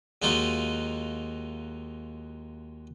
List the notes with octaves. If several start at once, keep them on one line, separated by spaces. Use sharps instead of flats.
D#2 G#3 D#4 F4 F#4 D#5